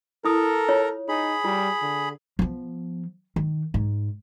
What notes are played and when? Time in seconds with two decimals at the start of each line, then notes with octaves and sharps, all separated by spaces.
0.25 E4 A4 A#4 A#5 D#6
0.69 F4 C#5
1.09 D#4 G#4 B5
1.45 G3 F4
1.82 D3
2.39 F3 B3
3.36 D#3
3.74 G#2